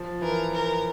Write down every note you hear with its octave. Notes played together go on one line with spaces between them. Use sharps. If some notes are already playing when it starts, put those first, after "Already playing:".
Already playing: F3
E3 A#4
A#4